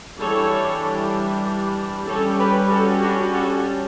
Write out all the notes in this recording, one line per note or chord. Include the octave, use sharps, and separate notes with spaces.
E3 G3 D4 A4 C#5
G3 C#4 A4 C#5
G4 B4
F#4 A4
D4 F#4
F#4 A4